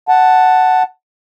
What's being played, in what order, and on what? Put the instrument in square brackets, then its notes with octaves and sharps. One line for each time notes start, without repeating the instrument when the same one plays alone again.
[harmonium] F#5 A5